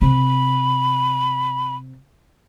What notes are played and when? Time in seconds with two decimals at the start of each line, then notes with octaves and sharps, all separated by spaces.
0.02 C3 B5